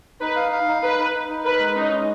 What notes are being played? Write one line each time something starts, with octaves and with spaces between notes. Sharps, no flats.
D#4 B4
F5
F5
D#4
D#4 B4
D#4
D#4
D#4
A#4 B4
G#3
C#4 D#4
G#3